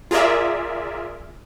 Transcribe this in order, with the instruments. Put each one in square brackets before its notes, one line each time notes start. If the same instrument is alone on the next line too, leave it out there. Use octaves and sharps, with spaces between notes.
[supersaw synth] F4 G#4 A#4 D5 E5